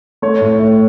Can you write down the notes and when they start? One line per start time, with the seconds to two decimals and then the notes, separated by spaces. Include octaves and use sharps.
0.22 A3 C#5
0.41 A2
0.59 A2